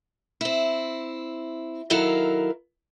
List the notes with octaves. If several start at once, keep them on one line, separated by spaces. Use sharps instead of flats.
C4 E4
D#3 F#3 E4 A4 A#4 F5